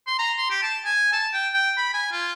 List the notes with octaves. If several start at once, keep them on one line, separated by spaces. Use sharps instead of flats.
C6
A#5
C6
G4
A5
G#5
A5
G5
G5
B5
G#5
F4